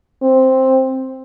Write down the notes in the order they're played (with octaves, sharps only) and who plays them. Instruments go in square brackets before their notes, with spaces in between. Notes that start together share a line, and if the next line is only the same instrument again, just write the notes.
[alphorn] C4